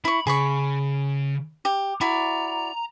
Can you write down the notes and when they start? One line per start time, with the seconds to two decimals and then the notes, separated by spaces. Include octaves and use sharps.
0.05 E4 B5 C#6
0.27 C#3 G#4 B5 C#6
1.65 G4
2.01 E4 F#4 D5 A#5